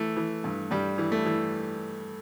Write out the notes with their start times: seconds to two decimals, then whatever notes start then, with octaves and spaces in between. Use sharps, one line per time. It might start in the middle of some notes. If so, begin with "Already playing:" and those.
Already playing: E3 A3
0.16 E3
0.44 G2
0.71 G2 G3
0.98 E3
1.12 A3
1.26 E3